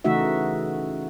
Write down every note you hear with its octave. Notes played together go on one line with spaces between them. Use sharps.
C#3 E3 A3 D#4 F#4 E5